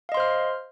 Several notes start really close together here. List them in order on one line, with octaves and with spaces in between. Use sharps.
F5 D#5 C6 C5 F6